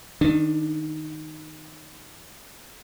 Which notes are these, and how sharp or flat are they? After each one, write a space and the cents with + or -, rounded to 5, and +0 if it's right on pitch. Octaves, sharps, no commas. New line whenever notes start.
D#3 -5 D4 +15